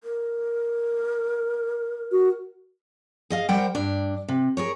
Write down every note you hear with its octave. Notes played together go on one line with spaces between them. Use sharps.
A#4
F#4
G#4 D#5 F5
G3 A#4 C5 F#5 G5
G2 D4
C3
G#4 A#4 C#5